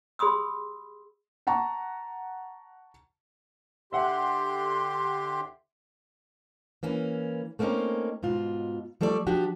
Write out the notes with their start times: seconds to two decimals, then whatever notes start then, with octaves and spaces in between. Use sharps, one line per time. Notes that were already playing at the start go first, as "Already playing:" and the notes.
0.19 G4 G#4 B5 C6 D#6 E6
1.47 F#5 A5 A#5 C#6
3.93 D3 G4 E5 F#5 C6
6.83 E3 A#3 C#4
7.59 A3 A#3 C4 C#4 D#4
8.23 G#2 B2 F4
9.01 F3 G3 A3 A4 C#5 D5
9.27 F3 D4 F#4 G4